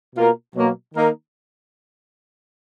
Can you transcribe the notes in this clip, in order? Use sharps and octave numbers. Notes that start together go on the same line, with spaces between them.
B2 A#3 F4 A#4
B2 F#3 A#3
D#3 A#3 D#4 A#4